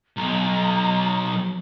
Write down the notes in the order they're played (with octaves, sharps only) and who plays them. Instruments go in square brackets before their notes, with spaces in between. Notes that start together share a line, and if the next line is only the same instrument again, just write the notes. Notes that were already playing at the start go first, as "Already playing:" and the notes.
[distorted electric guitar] B1 [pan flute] A#5